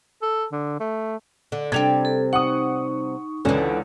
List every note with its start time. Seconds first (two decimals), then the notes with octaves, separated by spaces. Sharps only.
0.22 A4
0.52 D3
0.80 A3
1.52 D3
1.72 C3 G3 D4 G4 A4 G#6
2.05 A4
2.33 D#4 F#5 C#6 D#6
3.45 C#2 D3 E3 C#4